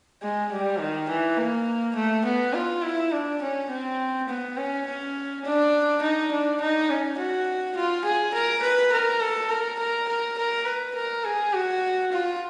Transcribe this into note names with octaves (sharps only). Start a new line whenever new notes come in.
G#3
G3
D#3
E3
A#3
A3
B3
F4
E4
D4
C#4
C4
B3
C#4
C#4
D4
D#4
D4
D#4
C#4
F#4
F4
G#4
A#4
B4
A#4
A4
A#4
A#4
A#4
A#4
B4
A#4
G#4
F#4
F4